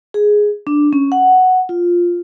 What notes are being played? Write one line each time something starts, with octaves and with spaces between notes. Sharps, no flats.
G#4
D4
C#4
F#5
F4